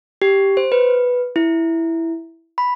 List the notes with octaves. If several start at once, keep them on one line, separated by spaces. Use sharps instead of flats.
G4
C5
B4
E4
B5